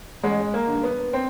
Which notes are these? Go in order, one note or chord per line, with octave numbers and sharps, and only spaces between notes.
A1 G#3
A#3
G2 D3
B3
C4